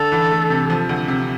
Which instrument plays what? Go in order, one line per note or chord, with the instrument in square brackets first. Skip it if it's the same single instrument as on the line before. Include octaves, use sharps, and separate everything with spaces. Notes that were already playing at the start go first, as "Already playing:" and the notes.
Already playing: [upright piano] D3 [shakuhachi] A4
[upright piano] E3
A3
C3
F3
D2
C3